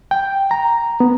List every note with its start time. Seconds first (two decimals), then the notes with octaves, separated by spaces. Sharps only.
0.11 G5
0.51 A#5
1.00 B3